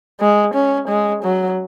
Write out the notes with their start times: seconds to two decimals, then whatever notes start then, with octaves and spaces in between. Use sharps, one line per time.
0.21 G#3
0.54 C#4
0.89 G#3
1.23 F#3